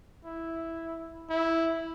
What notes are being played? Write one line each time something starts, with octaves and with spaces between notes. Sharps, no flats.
E4
E4